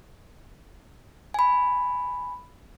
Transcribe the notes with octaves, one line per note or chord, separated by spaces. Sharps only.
G#5 B5